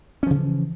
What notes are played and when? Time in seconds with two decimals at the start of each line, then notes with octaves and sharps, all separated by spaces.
0.23 C#4
0.27 F3
0.30 C#3
0.34 E3